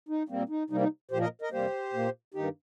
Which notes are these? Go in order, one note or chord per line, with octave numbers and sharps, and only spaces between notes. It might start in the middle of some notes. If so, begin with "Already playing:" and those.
D#4
A#2 G3 A#3 C4
D#4
C3 G3 A#3 D#4
D#4
A#2 F3 A#3 G4 C5
A#4 D#5
A#4 D#5
F2 C3 G3 A#3 G4 C5
A#2 A#3
G2 D#3 A#3 D#4 G4